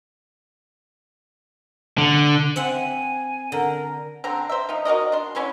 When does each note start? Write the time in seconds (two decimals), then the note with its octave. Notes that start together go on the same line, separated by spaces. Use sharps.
1.98 D3
2.56 C4 E5 F#5 G#5
3.52 D3 A#4
4.24 D3 C4 A#5
4.49 C5 E5
4.69 F3 D#4
4.85 F#4 A#4 D5 D#5
5.12 D4 C6
5.35 D3 C#4 E4 C6